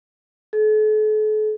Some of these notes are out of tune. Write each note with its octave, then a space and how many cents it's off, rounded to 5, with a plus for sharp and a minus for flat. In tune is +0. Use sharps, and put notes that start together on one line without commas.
A4 -45